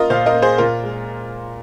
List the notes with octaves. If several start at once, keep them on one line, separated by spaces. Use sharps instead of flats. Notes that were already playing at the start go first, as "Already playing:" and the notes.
Already playing: A#3 F4 A#4 D#5
A#2 C5 F5
A#4 D#5
A#3
G#4 C5
A#2 F4 A#4
G#3